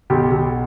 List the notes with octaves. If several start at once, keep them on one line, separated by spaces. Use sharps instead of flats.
B1 G4
B1